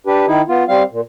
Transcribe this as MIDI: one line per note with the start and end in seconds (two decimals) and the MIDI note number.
0.07 0.26 62
0.07 0.26 67
0.07 0.26 71
0.27 0.42 51
0.27 0.42 63
0.27 0.42 64
0.48 0.64 59
0.48 0.64 65
0.68 0.83 55
0.68 0.83 60
0.68 0.83 77
0.91 1.01 46